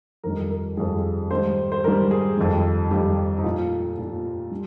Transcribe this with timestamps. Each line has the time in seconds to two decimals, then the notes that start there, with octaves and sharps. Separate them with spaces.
0.24 F2 D#3 G3 A#4
0.50 A#4
0.77 F2 D#3 G3 G#4
1.30 G#2 D#3 G3 C5
1.72 C5
1.84 G#2 D#3 G3 A#4
2.11 G#4
2.38 F2 D#3 G3
2.91 F2 D#3 G3 G4
3.38 D#4
3.44 A#2 F3 F4
3.98 A#2 F3
4.51 G3